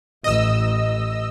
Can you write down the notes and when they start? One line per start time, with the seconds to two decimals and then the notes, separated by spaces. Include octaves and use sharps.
0.24 A1 D#5 E6